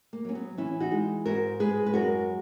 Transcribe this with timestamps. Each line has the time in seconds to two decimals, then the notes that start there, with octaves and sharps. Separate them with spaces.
0.13 A#3
0.25 F#3 C#4
0.35 B3
0.58 E3 C#4 E4
0.80 D#4 F#4
0.92 G#3
1.26 G#2 F#4 A#4
1.60 G#3 G#4 B4
1.86 B4
1.94 F#2 F#4 A#4